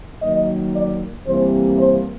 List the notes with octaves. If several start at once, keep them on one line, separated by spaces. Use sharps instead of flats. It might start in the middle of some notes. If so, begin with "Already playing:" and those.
D#3 F#3 A#3 D#5
D5
C3 E3 G3 A#3 C5
C5